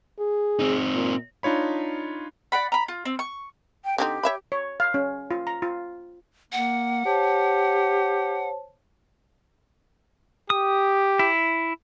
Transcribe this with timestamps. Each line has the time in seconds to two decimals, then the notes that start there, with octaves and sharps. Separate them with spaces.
0.19 G#4
0.59 C4 D#4
0.94 A#2
1.43 D4 D#4 F4 C#5 B5
2.52 D5 F#5 B5
2.72 A#5 B5
2.88 F4
3.05 C4
3.19 C#6
3.84 G5
3.98 D3 C4 D#4 G4
4.23 C#5 E5 B5
4.52 C#5
4.80 F5
4.94 C#4
5.31 F4
5.47 A#5
5.62 F4
6.53 A#3 F#5
7.06 G4 C5 C#5 A5
10.50 G4 D#6
11.19 E4